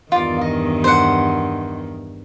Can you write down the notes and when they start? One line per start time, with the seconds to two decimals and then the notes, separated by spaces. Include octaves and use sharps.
0.12 E2 G2 D#3 F4 D5
0.41 D#5
0.84 C5 F#5